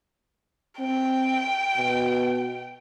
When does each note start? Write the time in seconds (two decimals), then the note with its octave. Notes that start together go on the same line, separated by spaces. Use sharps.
0.79 C4 G5
1.77 B2